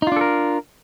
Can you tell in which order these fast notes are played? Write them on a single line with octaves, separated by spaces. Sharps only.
D#4 F4 D4 A4 A#4